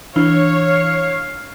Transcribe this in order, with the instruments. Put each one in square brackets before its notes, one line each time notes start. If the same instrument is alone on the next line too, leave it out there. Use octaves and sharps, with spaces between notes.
[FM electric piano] E3 [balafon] D4 [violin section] C#5 [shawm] F5